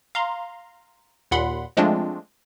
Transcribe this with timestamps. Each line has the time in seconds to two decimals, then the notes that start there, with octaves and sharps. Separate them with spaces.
0.15 F5 A#5 C6
1.31 D#2 A#2 F#5 B5 C6
1.77 F3 G#3 A3 C4 D4 F4